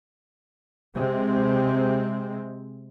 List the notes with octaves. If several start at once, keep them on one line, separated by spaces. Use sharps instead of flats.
C3 G#3 C4